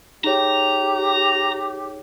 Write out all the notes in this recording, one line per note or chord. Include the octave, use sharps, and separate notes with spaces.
D#4 G4 G#4 C#5 A#5